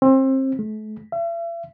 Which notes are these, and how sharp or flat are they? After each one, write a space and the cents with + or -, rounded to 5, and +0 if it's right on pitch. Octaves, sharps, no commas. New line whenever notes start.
C4 +25
A3 -40
E5 +40